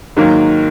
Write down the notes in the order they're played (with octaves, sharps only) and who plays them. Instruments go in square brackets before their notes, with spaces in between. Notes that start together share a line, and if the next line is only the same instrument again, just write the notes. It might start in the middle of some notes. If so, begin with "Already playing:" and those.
[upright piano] G#2 D#3 F#3 A#3